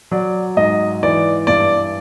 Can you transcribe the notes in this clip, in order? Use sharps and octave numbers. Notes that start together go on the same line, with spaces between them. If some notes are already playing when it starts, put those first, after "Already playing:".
F#3 D5
G#2 D#5
E3 D5
G2 D5